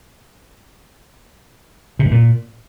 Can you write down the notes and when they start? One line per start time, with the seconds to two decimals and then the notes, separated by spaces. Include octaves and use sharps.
1.99 C3
2.05 G2
2.11 A#2